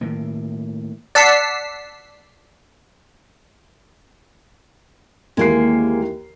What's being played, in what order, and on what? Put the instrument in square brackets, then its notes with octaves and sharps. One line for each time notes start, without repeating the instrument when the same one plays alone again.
[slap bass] A2 D#3 A#3
[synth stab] D5 F#5 A5 E6 B6 C7
[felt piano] D#2 E3 C7 [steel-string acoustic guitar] G#3 A#3